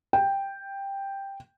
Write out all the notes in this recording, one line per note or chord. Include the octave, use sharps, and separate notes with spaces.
G5